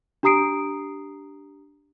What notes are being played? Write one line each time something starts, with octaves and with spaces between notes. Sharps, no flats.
D4 G4 A#5 D#6 C7 D7